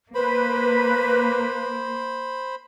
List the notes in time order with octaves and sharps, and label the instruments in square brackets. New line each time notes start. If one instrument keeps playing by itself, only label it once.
[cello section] A#3 [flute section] B4 [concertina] C5 B5